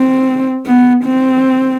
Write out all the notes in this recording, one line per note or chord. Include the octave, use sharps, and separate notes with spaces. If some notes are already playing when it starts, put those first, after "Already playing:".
Already playing: C4
B3
C4